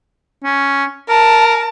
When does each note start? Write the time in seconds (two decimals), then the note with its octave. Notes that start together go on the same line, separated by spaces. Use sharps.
0.44 C#4
1.09 A#4 A5